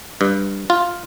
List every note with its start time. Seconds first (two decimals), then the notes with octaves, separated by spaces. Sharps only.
0.21 G2
0.70 F4